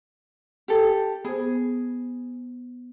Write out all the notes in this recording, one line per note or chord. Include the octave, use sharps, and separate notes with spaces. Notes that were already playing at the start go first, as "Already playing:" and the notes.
G4 A4
B3 G#4 C5